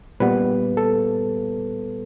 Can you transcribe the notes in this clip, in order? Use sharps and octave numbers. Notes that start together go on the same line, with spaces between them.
A#2 G3 B3 B4
A4